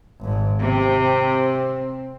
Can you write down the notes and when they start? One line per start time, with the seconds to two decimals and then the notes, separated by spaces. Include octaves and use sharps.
0.20 G#1 G#2
0.61 C3 C4